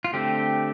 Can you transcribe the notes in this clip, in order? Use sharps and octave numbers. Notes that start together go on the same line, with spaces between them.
F4
D3 A3 C4 G4